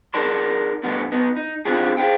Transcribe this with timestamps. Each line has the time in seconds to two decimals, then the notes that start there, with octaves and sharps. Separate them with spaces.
0.14 D#4 G#4 A#4 D5 A5 C6
0.83 C2 B2 D3 G3 A3 B3
1.12 B3 D#4
1.36 D#4
1.65 D#3 C4 D4 F4 G4 G#4
1.97 G#4 C5 C#5 F5 G5